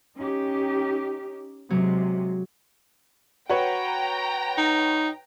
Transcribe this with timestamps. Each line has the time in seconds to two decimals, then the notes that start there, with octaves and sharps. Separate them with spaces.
0.16 C#4 D#4 G4
1.70 C3 F#3 G#3
3.49 F#4 B4 C#5 G5 A#5
4.58 D#4